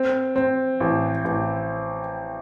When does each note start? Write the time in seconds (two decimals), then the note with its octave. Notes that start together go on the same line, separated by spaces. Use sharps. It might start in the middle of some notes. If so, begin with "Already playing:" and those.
Already playing: C4
0.36 C4
0.80 A1
1.25 A1